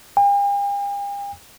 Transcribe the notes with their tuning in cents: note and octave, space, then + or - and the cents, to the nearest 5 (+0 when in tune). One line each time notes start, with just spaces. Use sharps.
G5 +45